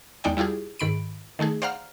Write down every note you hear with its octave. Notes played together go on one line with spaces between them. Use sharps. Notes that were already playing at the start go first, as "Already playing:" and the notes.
E2 G#3 D#4 D5 G5
G3 E4 F4 G4 G#4
G#2 D#3 B5 D7
D#3 A3 D#4 G#4
C5 D5 F5 F#5 A#5 F6